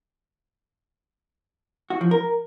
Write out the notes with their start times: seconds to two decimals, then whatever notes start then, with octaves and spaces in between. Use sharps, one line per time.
1.90 F#4
2.01 F3
2.11 A#4